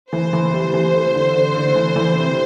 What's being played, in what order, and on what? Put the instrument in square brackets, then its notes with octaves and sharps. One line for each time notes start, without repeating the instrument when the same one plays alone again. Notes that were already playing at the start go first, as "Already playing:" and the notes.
[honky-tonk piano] E3 [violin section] C5
[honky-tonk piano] E3
G3
E3
A3
D3
D3
D3
E3
E3
C3